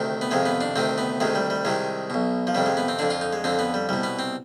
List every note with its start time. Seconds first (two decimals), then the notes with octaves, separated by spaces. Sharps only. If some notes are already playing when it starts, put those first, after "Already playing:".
Already playing: D2 C3 D#3
0.21 B3
0.31 F2 C3 D#3 G#3
0.46 B3
0.61 D4
0.76 D2 C3 D#3 C4
0.98 B3
1.20 D2 C3 D#3 G#3
1.35 G3
1.50 G3
1.65 C2 C3 D#3 G#3
2.10 B1 B2
2.47 F3
2.55 F2 C3 D#3 G3
2.66 G#3
2.77 B3
2.88 C4
2.99 F2 D3 D4
3.10 F4
3.21 D#4
3.33 G#3
3.44 F2 D3 C4
3.59 B3
3.74 G3
3.89 C2 B2 G3
4.03 B3
4.19 C4